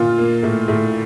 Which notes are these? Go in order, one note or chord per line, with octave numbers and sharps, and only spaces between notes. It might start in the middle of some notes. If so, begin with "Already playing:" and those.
Already playing: A#2 F4
A#3
A2
A2